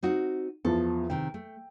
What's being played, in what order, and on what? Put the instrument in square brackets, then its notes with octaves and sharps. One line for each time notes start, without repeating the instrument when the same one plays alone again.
[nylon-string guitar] C4 D#4 F#4
[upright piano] E2 F3 [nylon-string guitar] A4
[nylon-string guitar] C3 D#3 [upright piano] G5
[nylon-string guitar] A3